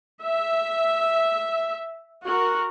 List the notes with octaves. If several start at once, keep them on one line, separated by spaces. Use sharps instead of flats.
E5
F#4 A#4